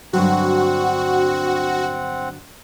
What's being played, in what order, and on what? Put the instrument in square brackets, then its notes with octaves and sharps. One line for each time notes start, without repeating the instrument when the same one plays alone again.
[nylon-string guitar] G2 D3 F#3 [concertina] C4 F#5 [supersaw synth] F#4